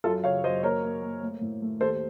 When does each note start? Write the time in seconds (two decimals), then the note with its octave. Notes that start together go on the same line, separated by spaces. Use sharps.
0.04 F#2 F4 A4
0.24 C#3 C#5 F5
0.44 F#2 C5 D#5
0.63 A#3 A#4 C#5
0.83 A#3
1.02 A#3
1.22 A3
1.41 A2
1.62 A3
1.81 D#2 A4 C5